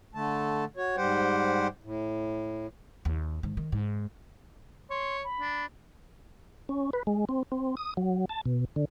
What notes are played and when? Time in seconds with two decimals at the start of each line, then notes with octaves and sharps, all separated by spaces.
0.15 D3 A3 A5
0.77 F#4 C#5
0.97 G#2 G3 G4 C5 F#5 G5
1.84 A2
3.05 D#2
3.43 G#2 D#3
3.57 D#3
3.72 G#2
4.90 C#5 C6
5.24 B5
5.40 D4
6.69 C#4
6.93 B4
7.07 G#3
7.29 C4
7.52 C4
7.77 D#6
7.97 F#3
8.29 A5
8.45 B2
8.76 D3